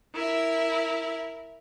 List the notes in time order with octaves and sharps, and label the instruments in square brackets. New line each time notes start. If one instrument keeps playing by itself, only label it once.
[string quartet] E4 A#4 E5